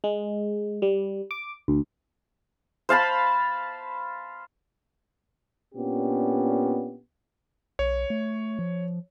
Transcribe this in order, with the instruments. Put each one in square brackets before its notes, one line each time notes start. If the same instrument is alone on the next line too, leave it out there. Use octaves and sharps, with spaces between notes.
[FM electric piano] G#3
G3
D6
D2
[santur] C5 F5 A5 B5
[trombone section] A#2 B3 C#4 D4 G4
[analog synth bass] B1 [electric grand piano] C#5
[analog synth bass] A3
F3